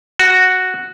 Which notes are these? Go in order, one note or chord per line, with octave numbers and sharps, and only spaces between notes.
F#4